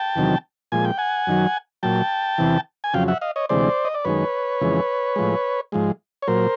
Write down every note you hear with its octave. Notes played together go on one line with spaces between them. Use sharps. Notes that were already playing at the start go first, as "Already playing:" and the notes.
Already playing: G5 A5
E2 C3 D#3 F#3
A#2 F3 G#3 G#5
G5
F#5 G#5
F#2 D#3 F#3
A#2 F#3 G5 A5
E2 C3 E3
G#5
F2 C#3 F#3 F5 G5
E5 F#5
D#5 F5
C#5 D#5
D2 C3 E3 G#3 C5 D5
D#5
D5
F#2 D#3 G#3 B4 C#5
F2 C#3 E3 G#3
A2 F3 G#3
G#2 F3 G#3
C#5
A#2 F#3 A#4 C5